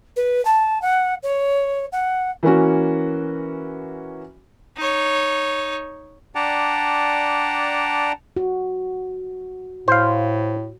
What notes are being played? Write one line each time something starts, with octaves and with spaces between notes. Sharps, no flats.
B4
A5
F#5
C#5
F#5
E3 A#3 C#4 F#4
D#4 C#5
D4 D5 F#5 G5 A5 A#5
F#4
A2 C5 F5